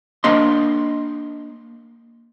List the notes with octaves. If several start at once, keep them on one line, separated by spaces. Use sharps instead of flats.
A#3 D4 D#5 C6